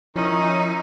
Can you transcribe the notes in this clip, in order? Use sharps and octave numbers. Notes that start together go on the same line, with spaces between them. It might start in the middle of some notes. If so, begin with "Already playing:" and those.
D#3 F3 C#4 D#4 E4